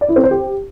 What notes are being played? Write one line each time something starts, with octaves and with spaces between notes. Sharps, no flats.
D5
E4
C4
C5
G4